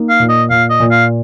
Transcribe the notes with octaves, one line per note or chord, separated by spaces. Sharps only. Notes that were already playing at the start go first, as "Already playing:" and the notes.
Already playing: A#3 D#4
F5
A#2
D#5
A#2 F5
D#5
A#2
F5